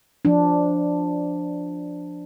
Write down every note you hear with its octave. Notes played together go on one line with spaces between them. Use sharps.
F3 D4